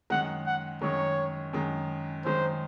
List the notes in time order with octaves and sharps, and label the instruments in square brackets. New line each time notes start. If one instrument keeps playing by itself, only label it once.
[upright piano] F#2 D#3 G#3 [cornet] F#5
[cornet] F#5
[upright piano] F#2 D#3 G#3 [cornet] C#5
[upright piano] F#2 D#3 G#3
[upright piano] F#2 D#3 G#3 [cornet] C5